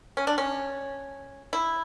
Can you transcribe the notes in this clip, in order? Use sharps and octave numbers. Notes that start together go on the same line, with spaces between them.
C#4
D4
C#4
E4